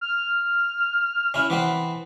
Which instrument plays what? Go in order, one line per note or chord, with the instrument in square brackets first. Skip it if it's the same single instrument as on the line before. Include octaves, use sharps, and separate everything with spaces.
[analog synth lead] F6
[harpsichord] C#4 E4
E3 B3 C4